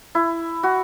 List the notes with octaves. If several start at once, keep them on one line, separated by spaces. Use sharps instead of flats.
E4
F#4